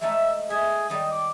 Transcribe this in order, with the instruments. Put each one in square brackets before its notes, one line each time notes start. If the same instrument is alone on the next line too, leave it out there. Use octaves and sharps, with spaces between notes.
[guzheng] G#3 A3 D#4 [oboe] E5
[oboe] G#4 [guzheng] E5
[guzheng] D#3 G3 [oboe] D#5
[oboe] D6